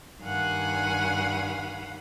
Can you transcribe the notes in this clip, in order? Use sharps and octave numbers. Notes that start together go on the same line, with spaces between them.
G2 D#3 F5 F#5 G#5 B5